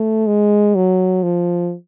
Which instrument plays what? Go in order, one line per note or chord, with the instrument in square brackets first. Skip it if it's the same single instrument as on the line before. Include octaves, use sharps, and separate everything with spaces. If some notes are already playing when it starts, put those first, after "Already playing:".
Already playing: [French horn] A3
G#3
F#3
F3